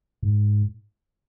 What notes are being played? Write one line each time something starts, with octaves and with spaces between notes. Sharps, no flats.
G#2